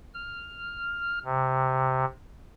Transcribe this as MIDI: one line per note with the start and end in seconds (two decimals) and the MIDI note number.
0.15 1.19 89
1.25 2.05 48